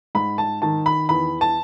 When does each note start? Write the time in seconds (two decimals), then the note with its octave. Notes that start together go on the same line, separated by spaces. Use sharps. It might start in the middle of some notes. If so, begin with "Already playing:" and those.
0.15 G#2 B5
0.38 A5
0.62 D#3 A5
0.86 B5
1.09 E2 B5
1.41 A5